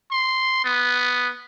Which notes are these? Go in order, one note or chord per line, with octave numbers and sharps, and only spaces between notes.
C6
B3